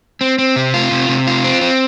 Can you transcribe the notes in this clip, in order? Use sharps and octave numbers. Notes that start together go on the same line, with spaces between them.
C4
C4
C3
F4
C3
C3
F4
C4
C4